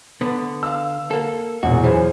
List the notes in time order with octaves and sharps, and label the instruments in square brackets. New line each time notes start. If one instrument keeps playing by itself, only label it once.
[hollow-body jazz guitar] D3 B3
[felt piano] F5 E6
[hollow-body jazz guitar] A#3 A4
[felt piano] E1 A#1 E2 [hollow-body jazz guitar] F#4
[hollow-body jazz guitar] F#2 E3 F3 [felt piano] G#4 C5 G#5